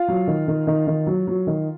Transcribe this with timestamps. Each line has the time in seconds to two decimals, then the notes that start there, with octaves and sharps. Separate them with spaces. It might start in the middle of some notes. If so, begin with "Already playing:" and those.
Already playing: F4 F5
0.08 F#3
0.27 D#3
0.48 D#3
0.67 D#3
0.87 D#3
1.07 F#3
1.27 F#3
1.47 D#3